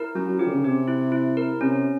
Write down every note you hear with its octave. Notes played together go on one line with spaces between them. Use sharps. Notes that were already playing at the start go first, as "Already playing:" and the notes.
Already playing: E4 A#4
F#3 C#4
F#3
F3 G4
D3
C#3
C3 G4
E4
E4
A#4
C3 C#4